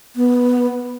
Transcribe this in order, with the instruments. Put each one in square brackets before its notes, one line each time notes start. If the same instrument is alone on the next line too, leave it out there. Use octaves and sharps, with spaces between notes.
[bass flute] B3